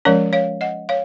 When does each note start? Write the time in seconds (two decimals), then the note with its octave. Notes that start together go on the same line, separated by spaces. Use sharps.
0.05 F3 G#3 C#4 A#4 C#5
0.33 C#5 F5
0.61 D#5 F#5
0.89 C#5 F5